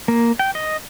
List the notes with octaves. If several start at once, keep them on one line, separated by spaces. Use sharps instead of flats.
A#3
G5
D#5